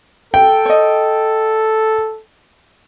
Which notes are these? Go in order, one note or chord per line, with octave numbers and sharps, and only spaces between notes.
A4 G5
C#5 D#5